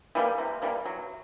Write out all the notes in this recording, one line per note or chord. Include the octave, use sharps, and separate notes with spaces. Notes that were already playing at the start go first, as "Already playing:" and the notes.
E3 G3 A#3
C3
E3 G3 A#3
F#3